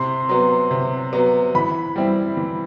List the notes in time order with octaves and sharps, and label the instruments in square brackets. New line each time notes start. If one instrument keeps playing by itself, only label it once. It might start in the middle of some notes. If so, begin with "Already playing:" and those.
Already playing: [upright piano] C3 [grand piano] C6
[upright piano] F#3 B3
C3
F#3 B3
[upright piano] E3 [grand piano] B5
[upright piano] G3 C4 E4
E3